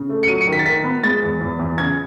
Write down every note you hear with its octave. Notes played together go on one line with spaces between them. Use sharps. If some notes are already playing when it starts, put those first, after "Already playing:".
Already playing: C#3
A3
C#7
F#3 D#7
C#7
D#3
B6
A6
D#3 B6
B3
G#3 A6
E2
E2
E2
C#3 G#6